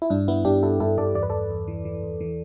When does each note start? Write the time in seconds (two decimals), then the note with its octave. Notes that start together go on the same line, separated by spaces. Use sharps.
0.02 E4
0.10 G2 D4
0.28 G2 B3 E4
0.45 G2 D4 G4
0.63 G2 E4 A4
0.80 G2 E4 A4
0.98 G2 A4 D5
1.15 E2 D5
1.23 B4
1.30 E2 A4 D5
1.50 E2
1.68 E3
1.85 E3
2.03 E2
2.21 E3